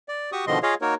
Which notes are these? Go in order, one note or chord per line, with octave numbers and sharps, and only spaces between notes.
D5
F#4 G4 C#6 D#6
B2 D3 D#3 F3 D#5 C6
F4 G#4 C#5 D#5 F5
A#3 D#4 F#4 A#4 C#5